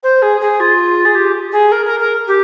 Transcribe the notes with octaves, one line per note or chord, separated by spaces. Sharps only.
C5
G#4
G#4
F4
G#4
G4
G#4
A#4
A#4
A#4
G4